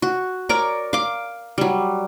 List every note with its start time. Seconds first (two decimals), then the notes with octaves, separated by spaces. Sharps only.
0.02 F#4
0.49 A#4 C#5 D5 A#5
0.93 F5 D6
1.58 F#3 G3